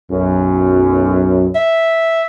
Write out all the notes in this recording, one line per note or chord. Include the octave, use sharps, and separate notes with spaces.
B1 F#2
E5